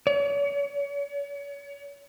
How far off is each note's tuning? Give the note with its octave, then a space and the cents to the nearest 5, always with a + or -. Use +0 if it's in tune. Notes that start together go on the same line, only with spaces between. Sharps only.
C#5 +40